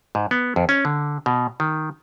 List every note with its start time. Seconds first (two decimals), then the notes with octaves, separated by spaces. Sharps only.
0.15 G#2
0.31 B3
0.56 F2
0.69 C#4
0.85 D3
1.26 B2
1.60 D#3